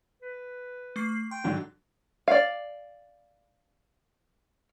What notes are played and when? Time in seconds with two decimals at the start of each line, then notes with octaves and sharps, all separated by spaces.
0.22 B4
0.96 A3 C#6 C7
1.31 G5 C6
1.44 G#2 D3 F#3
2.28 D5 F5